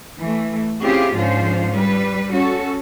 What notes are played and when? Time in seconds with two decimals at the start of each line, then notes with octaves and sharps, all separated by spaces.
0.21 E3 A3
0.82 C4 C#4 E4 F4 G4 G#4
1.15 G#2 D3 F3 C#4 F4 C5
1.72 G3 B4
2.31 C#4 F#4 A4